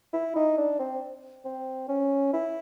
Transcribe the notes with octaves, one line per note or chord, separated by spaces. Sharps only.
E4
D#4
D4
C4
C4
C#4
E4